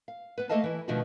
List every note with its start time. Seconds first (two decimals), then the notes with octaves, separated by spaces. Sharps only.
0.08 F5
0.38 B3 B4
0.49 A3 A#3 A4 D#5 F5 A5
0.64 E3 E4
0.88 B2 D#3 F3 A3 D4 F#4